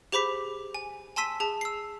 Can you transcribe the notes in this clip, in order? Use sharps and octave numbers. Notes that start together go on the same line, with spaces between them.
G4 G#4 C5 B5 D6 B6
G#5
G#5 A5 C6 E6 B6 D#7
G#4 A5
E6 C7